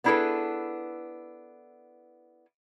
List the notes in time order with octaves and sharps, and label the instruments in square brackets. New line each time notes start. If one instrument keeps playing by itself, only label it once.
[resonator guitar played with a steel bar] B3 D4 E4 G#4 A4 B4